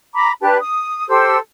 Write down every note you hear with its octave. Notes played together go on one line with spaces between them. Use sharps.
A#5 B5 D6
D4 G4 B4 A5
D#6
G4 A4 C5 E6